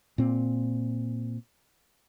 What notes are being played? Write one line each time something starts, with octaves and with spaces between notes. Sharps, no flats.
A#2 C4